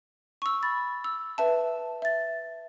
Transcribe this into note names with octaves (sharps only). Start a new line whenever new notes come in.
C#6 E6
B5 A6
E6
B4 E5 A5
E5 A6